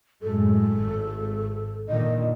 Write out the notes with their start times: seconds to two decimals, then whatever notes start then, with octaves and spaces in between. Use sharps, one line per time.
0.23 F#2 A2 G#3 A4
0.80 G#1
1.89 A#2 D3 D#3 D#5